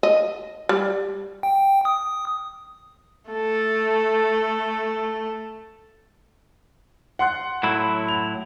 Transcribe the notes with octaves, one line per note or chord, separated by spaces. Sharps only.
D#5
G3
G5
D#6
A3 A4
F#5 C6 F#6
A2 F#3 E4
F7